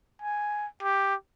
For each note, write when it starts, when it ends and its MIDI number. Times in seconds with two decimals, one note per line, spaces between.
0.22 0.67 80
0.83 1.15 67